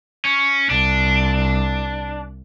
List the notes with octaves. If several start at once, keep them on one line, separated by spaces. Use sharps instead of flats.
C#4
C2 D4